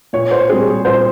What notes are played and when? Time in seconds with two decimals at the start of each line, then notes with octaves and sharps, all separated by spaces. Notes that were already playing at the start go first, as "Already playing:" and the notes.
0.13 A#2 C#5
0.31 C5
0.50 G3 C4 G#4
0.85 A#2 C5